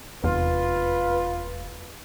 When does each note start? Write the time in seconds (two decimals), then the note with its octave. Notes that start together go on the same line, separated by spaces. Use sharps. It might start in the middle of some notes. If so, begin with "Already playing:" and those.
0.24 F1 E2 F4 B4